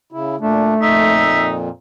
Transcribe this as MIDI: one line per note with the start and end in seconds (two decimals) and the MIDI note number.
0.12 0.36 49
0.12 0.36 64
0.40 0.74 46
0.40 1.29 57
0.40 0.74 62
0.81 1.69 41
0.81 1.69 46
0.81 1.56 63
0.81 1.46 76